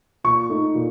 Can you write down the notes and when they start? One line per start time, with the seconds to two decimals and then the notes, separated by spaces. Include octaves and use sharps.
0.24 A#2 C#6
0.49 A3 D#4
0.75 A#2